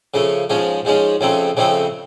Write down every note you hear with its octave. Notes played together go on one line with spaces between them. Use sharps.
C#3 F3 A3
G#2 F3 G#3 C#4
G#2 F3 G#3 C#4
F2 C#3 F3 A3 C4
F2 C#3 F3 A3 C4